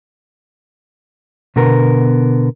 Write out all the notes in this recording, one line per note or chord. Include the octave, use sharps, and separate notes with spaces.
B2 D3 B3 A#4